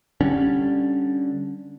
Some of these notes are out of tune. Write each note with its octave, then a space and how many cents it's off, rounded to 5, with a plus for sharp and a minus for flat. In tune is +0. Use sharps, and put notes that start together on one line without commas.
D3 -5 G3 +0 C#4 +0